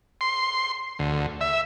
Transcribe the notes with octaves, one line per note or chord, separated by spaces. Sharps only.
C6
D2
E5